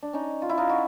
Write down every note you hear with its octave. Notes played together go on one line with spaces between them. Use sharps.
D4
C#4 D#4
F4
E4
D#4 F4
E4 F#4